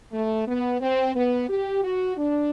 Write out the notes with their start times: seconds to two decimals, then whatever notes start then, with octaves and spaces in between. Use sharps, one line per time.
0.12 A3
0.46 B3
0.80 C4
1.15 B3
1.48 G4
1.83 F#4
2.17 D4